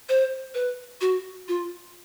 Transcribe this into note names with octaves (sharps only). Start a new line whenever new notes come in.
C5
B4
F#4
F4